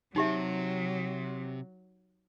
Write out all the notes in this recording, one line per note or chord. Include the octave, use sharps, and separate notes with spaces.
C3 F#3 D#4 G4 E5